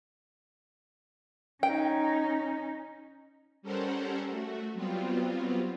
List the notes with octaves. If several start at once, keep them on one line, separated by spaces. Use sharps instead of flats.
C#4 D#4 G5
G3 C#4 A4 A#4 C5 F#5
A3 F#4
F#3 G3 B3 C4 F4